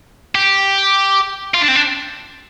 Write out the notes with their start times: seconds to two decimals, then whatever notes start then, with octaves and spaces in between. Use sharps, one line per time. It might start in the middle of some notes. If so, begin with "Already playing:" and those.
0.35 G4
1.54 F4
1.61 D4
1.68 C4
1.75 D4